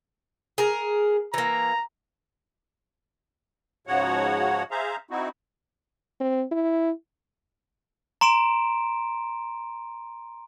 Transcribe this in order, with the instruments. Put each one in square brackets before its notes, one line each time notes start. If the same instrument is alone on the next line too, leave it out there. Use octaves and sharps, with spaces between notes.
[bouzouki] G#4 A#4
[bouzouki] E3 A#3 [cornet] A#5
[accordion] G#2 C#3 F3 F#4 C#5 F#5
G#4 C5 E5 F5 A#5
C4 D#4 E4 F#4
[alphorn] C4
E4
[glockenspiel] A#5 C6 D7 E7